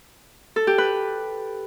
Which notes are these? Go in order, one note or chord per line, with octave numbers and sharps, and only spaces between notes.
A4
G4
B4